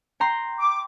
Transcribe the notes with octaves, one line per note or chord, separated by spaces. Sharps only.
G5 A#5 C6
D6